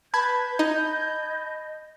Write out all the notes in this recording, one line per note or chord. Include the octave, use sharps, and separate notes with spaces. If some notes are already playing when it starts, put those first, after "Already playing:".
B4 A5 B5 G6 G#6
D#4 D#5